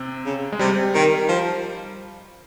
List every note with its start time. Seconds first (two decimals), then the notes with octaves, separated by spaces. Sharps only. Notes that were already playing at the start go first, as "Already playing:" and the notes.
Already playing: C3 C4
0.25 C#3
0.52 G#3
0.59 C3 G3
0.94 D#3
1.28 F3